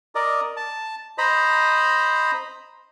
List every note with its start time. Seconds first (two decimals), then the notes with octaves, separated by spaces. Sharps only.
0.15 A#4 D5 D#5
0.57 A5
1.18 C5 D#5 A#5 B5